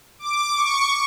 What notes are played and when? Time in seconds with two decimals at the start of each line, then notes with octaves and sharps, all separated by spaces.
0.19 D6
0.55 C#6